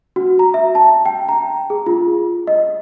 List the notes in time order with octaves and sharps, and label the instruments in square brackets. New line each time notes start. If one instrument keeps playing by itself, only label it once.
[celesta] F#4
A#5
E5
A5
G5
A#5
G#4
F4
D#5